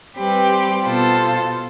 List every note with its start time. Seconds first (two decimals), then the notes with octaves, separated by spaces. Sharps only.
0.18 G3 C4 G4 B4
0.84 B2 B3 F4 A4 C5